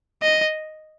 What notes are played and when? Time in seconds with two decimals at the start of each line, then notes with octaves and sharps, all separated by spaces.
0.22 D#5